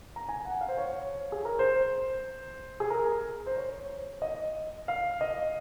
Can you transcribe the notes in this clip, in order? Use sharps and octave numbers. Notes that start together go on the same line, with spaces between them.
A#5
G#5
F#5
F5
C5
C#5
G#4
A#4
C5
G#4
A#4
C5
C#5
D#5
F5
D#5